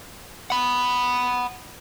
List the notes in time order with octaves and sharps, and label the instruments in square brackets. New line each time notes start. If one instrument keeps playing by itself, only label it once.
[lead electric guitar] F#5 B5